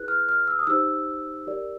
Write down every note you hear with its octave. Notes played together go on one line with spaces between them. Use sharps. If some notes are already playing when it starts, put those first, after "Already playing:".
Already playing: E4 G#4 B4 F#6
F6
F6
E6
D#6
D#4 G4 C5 E6
G4 A#4 D5